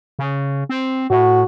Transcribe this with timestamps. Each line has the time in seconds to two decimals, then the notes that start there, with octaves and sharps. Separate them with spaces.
0.19 C#3
0.69 C4
1.10 A2 F#4